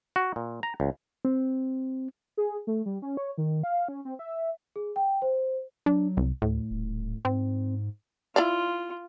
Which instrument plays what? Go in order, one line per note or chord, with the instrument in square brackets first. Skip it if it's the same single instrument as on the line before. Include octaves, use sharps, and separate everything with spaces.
[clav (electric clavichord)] F#4
A#2
A#5
C#2
[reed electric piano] C4
[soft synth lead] G#4
A3
G3
C#4
C#5
D#3
F5
C#4
C4
E5
[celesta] G#4
G5
C5
[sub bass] F#3 [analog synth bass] D4
[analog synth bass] C2
[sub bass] D2 [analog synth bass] A2
[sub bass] D#1
[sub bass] G#2 [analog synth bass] C4
[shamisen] E4 D5 F5 [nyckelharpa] F4